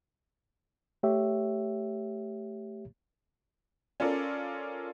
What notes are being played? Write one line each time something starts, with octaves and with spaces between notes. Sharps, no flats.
A3 G4 C#5 E5
C#4 F4 A4 A#4 D5